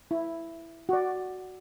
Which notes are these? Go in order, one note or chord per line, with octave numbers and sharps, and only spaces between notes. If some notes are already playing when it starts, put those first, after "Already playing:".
E4
F#4 D5